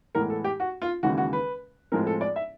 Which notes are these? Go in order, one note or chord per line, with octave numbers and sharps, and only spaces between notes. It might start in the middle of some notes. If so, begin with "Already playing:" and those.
A2 E3 G#3 B3 A#4
A4
G4
F#4
F4
D#2 C#3 E3 G#3 F#4
F#4
B4
A2 F3 G#3 C4 A#4
A4
D5
E5